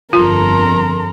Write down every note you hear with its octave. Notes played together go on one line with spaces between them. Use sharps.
G1 F2 F4 A4 A#4 A#5 C6